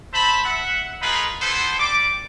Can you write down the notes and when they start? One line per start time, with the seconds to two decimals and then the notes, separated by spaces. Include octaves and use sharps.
0.14 C5 E5 A5 B5
0.45 E5 F#5
1.02 D#4 F4 G#4 A#4 B4
1.41 B3 E4 A4 C5
1.78 G3 D5 D6